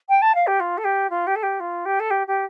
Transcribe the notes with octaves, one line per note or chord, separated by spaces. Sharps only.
G5
A5
F5
G4
F4
A4
G4
F4
G4
A4
G4
F4
G4
A4
G4
G4